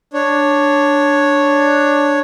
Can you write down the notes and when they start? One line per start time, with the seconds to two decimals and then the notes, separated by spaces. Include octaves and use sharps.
0.14 D4 C#5